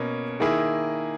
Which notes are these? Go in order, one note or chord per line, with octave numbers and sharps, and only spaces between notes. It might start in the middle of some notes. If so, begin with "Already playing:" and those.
Already playing: B2 A#3 C#4
D#3 A#3 E4 G#4